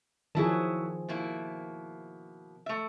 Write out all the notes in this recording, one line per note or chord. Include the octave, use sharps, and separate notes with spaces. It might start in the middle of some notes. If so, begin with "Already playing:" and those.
D#3 F3 F#3 E4 G#4 A5
B2 A#3 E4
A3 E5